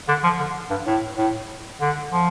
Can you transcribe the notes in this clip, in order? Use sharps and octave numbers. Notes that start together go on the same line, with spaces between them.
D3
F3
D3
G2
A2
A2
D3
F3